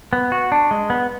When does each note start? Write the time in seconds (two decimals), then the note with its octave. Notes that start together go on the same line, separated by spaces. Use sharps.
0.13 B3
0.32 F#4
0.52 D4
0.71 G#3
0.90 B3